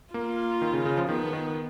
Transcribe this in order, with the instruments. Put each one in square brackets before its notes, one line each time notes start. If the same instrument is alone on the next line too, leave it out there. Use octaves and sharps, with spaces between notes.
[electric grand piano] A#3 [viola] F4
[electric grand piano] D#3
C#3
C#3
F3
[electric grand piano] D#3 [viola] B3
[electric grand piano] D#3